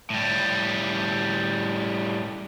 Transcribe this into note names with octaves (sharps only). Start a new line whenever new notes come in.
A2 G3